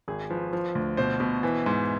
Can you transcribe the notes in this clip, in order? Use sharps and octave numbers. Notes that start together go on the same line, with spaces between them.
G#1 G#4
F3 B4
F3
D2
B2 C5
B2
E3
G#2